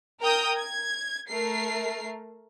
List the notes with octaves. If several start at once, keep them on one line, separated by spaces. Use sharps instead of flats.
A#4 G5 A#5 D#6 G6
G#6
A3 A#4 C7